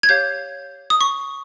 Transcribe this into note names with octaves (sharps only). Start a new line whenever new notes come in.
G#6
G4 C#5 F5 G6
D#6
C#6